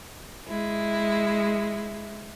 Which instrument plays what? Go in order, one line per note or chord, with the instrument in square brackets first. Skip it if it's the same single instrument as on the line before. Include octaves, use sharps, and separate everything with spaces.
[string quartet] G#3 E4